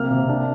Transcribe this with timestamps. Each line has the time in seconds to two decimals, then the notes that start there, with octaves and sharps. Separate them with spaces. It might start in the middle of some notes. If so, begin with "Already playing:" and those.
Already playing: C3 A#3 F6
0.10 C3
0.29 D4